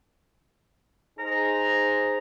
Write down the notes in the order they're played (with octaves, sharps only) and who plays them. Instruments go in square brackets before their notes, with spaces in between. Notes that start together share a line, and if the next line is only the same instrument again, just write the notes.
[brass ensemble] D#4 G#4 C5 [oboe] A#5